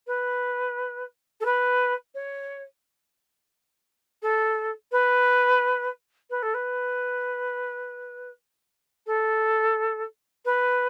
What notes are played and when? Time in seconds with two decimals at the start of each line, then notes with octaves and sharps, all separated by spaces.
0.06 B4
1.40 A4
1.45 B4
2.14 C#5
4.22 A4
4.91 B4
6.30 B4
6.42 A4
6.54 B4
9.06 A4
10.45 B4